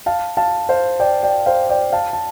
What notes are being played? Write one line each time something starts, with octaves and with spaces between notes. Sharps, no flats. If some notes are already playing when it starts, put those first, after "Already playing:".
F5 A5
F5 A5
C5 F5
D5 G5
D5 G5
C5 F5
D5 G5
F5 A5
A5